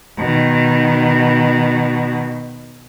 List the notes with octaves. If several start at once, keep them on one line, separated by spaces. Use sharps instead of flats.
B2 D#3